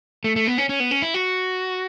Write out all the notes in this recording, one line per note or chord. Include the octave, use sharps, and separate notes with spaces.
A3
A3
B3
C#4
C#4
B3
C#4
E4
F#4